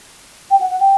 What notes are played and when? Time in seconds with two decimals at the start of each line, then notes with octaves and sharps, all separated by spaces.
0.50 G5
0.60 F#5
0.71 F#5
0.80 G5